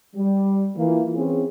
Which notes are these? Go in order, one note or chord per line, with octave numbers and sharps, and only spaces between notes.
G3
E3 A#3 F4
E3 C4 C#4 G#4